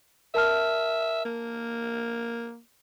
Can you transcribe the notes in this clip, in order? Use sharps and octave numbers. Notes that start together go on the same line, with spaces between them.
A#4 E5 A5 F6
A#3